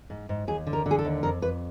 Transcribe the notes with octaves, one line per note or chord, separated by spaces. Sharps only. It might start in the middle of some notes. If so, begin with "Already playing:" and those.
G#2
G#2
D#2 G#4
D3
A#4
D3
G#4
A4
D#2
F2 A#4
F2 B4